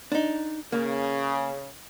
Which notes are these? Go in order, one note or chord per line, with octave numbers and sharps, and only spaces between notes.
D4 D#4
C#3 A#3